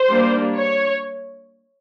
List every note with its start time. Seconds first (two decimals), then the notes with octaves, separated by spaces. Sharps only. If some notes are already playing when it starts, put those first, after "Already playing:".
Already playing: C5
0.09 G3 A#3 D4
0.56 C#5